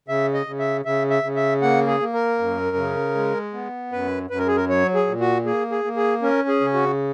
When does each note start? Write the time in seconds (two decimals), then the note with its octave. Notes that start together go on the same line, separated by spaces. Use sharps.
0.08 C#3 E5
0.34 D#5
0.46 C#3
0.59 E5
0.85 C#3 E5
1.10 E5
1.23 C#3
1.36 E5
1.62 A#3 F#5
1.87 G#4
2.00 A#3
2.13 A#4
2.39 F#2
2.76 C#3
3.15 G#3
3.54 B3
3.92 F#2 B4
4.30 F#2 B4
4.39 A#4
4.48 G#4
4.57 A#4
4.69 F#3 C#5
4.95 G#4
5.07 A#2
5.20 F#4
5.45 A#3 G#4
5.71 G#4
5.84 A#3
5.97 G#4
6.22 C#4 A#4
6.48 G#4
6.60 C#3
6.74 F#4